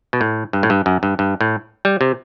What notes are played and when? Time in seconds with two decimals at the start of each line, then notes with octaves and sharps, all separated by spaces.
0.13 B2
0.21 A2
0.53 G2
0.63 A2
0.70 G2
0.86 F#2
1.03 G2
1.19 G2
1.41 A2
1.85 G3
2.01 C3